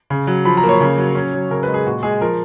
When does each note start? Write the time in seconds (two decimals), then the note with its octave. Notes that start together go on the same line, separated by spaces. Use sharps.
0.10 C#3
0.27 F#3
0.45 F3 B5
0.57 A#5
0.63 A#3
0.69 C#5
0.80 C#3
0.98 F#3
1.15 C#4
1.34 F#3
1.50 C#3 A#4
1.63 G#3 B4
1.74 G#4
1.86 A#2 F#4
2.03 G#3 G#4
2.21 F3 A#4